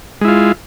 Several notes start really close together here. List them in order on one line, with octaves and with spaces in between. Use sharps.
G#3 E4 F4